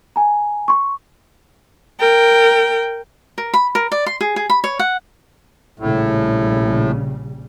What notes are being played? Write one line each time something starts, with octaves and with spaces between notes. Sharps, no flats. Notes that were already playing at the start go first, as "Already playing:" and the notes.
G#5 A#5
C6 C#6
A#4 G5
A#4
B5
A#4
D5
C6
G#4
G#4
B5
C#5
F#5
A#1 A2 C#3 G3